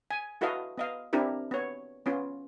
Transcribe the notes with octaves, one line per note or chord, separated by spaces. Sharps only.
G#5
E4 F#4 A4 B4 D#5 F5
B3 D#5 F5
C4 D4 E4 G4 A#4
B3 C#5
B3 C#4 F4